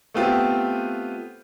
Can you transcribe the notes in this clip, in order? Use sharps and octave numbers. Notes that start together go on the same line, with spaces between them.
A3 B3 C4 F4 G4